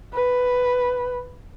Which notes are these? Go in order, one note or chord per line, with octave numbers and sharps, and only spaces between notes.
B4